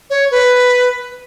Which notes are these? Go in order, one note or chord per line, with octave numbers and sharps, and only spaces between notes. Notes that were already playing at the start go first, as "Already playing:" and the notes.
C#5
B4